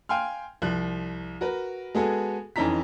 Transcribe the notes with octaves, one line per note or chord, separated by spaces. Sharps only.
F5 G5 G#5 C6 F6
C2 F3 F#6
F#4 A#4 B4
G#3 B3 F#4 G#4 A4
F2 E3 C#4 D#4 A#5 B6